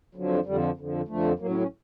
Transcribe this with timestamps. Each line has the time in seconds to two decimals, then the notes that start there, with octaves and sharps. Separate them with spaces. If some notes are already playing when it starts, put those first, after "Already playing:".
0.15 F2 D3 F3 F#3
0.46 F2 D3 F3 G3
0.77 F2 D3 F3
1.07 F2 D3 F3 A3
1.39 A2 F#3 A#3
1.49 C#4
1.60 C#4